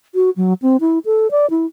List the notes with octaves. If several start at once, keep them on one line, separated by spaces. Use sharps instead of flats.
F#4
F#3
C4
E4
A4
D5
E4